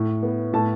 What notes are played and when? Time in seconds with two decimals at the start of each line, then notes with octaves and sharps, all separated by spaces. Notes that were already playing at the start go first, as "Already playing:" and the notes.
Already playing: A2
0.23 B3
0.53 A2 A5